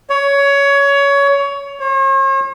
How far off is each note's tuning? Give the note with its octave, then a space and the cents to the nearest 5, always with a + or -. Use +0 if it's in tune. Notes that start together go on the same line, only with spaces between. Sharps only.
C#5 +20
C#5 -45